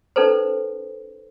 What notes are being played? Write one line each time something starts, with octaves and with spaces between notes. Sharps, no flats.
C#4 D#4 A4 B4 C5